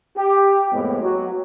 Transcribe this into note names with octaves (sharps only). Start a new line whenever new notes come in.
G4
F2 A2 G#3 A#3 B3
F#3 F#4